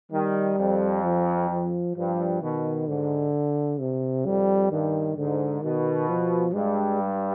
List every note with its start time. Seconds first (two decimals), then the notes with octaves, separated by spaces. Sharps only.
0.12 D#3 G3
0.58 F2
1.04 F3
1.50 F3
1.96 G2 F3
2.41 B2 D#3
2.88 G#2 D3
3.80 C3
4.26 F2 G3
4.71 G2 D#3
5.17 G#2 D3
5.62 B2 D#3
6.09 F3
6.54 G2 G#3
7.01 G3